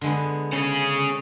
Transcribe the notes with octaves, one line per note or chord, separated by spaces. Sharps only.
D3 G#3 B3
C#4 G#4